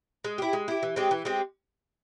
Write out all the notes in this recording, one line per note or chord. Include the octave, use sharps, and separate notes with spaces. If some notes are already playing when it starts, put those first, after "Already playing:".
G#3
E4 G4
G#3
E4 G4
E3
G#3 C4 G4
E3
G#3 C4 G4